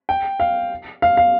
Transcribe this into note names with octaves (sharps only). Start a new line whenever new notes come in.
G5
F5
F5
F5